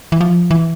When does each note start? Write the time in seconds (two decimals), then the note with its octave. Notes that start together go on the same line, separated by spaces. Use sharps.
0.12 E3
0.21 F3
0.51 E3